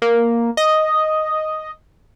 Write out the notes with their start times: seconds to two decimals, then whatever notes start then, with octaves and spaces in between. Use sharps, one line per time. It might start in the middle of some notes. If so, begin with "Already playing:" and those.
0.02 A#3
0.57 D#5